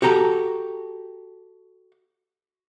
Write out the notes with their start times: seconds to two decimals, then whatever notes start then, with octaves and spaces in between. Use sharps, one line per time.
0.02 F#4 G4 A4 A#5